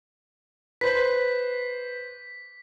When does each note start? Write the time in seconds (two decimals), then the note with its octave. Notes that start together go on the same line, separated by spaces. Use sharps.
0.81 B4 C5 B6